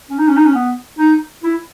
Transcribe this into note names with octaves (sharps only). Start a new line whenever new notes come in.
C#4
D#4
C#4
D#4
C#4
B3
D#4
E4